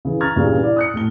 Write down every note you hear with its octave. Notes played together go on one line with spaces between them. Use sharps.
C#3 E3
A#5 C#6 F6 G#6 A6
G2 A#2 C#3 E3 G3
E4 D5
D#6 F#6 C#7
A2 A3 G7